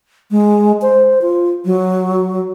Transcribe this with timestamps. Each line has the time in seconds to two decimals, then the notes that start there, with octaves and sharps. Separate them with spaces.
0.31 G#3
0.82 C5
1.22 F4
1.65 F#3